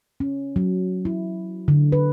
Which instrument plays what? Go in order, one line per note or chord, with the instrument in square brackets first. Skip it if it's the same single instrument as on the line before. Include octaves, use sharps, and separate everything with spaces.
[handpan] C#4
F#3
E4
D3
B4